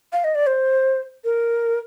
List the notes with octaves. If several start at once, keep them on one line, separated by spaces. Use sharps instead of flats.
F5
D#5
D5
C5
A#4